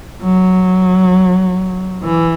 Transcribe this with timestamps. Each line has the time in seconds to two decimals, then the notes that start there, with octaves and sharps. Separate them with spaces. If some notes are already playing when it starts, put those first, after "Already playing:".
0.23 F#3
2.03 E3